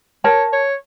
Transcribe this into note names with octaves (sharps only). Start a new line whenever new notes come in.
A#4 C#5 A5
C#5